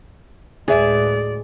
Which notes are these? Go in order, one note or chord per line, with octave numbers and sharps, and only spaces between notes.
D2 A2 G#3 G#4 B4 D5 E5 G#5